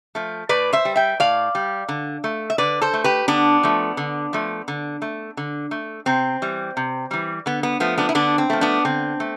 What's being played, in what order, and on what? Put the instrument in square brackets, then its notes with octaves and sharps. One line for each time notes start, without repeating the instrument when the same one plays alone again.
[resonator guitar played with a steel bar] F3 A3
A2 B4 D5
C5 E5
G3
E5 G5
A2 D5 F5
G3
D3
A3
E5
D3 B4 D5
A4 C5
A3
G4 B4
D3 B3 D4
F3 A3
D3
F3 A3
D3
A3
D3
A3
C3 C4
E3 G3
C3
E3 G3
D3 B3
B3
F3 A3 B3
B3 D4
E4
D3 B3 D4
C4
F3 A3
B3 D4
D3 C4
A3